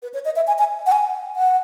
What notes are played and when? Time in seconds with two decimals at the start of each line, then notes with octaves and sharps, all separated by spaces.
0.03 B4
0.14 C#5
0.25 D#5
0.36 E5
0.47 G#5
0.59 G#5
0.86 F#5
0.92 G#5
1.36 F#5